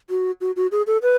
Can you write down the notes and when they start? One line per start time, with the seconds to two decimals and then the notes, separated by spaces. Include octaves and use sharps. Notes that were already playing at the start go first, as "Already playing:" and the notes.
0.10 F#4
0.41 F#4
0.56 F#4
0.72 G#4
0.87 A4
1.02 B4